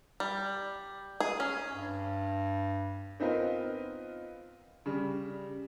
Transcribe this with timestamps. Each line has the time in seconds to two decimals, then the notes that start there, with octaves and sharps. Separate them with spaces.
0.20 G3
1.20 G#4
1.40 C#4
1.73 G2
3.20 B3 C4 D#4 F4 A#4 B4
4.86 C#3 G3